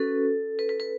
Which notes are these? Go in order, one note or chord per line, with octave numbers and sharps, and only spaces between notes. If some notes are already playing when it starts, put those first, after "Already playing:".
Already playing: C#4 F#4 A4 B4
B4
B4
B4